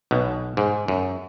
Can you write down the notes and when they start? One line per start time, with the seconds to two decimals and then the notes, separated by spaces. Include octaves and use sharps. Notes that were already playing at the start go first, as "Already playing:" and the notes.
0.11 B1 B2
0.57 G#2
0.88 F#2